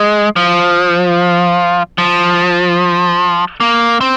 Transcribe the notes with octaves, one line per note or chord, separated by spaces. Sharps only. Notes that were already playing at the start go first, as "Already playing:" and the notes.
Already playing: G#3
F3
F3
A#3
C4